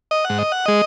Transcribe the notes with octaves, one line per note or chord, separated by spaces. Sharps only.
D#5
G#2 F#5
D#5
F#5
G#3 D#5